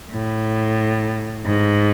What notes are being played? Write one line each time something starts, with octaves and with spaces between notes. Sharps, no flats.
A2
G#2